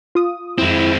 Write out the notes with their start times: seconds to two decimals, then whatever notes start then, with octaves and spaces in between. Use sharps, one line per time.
0.15 F4 D#6
0.58 F2 G#3 C4 E4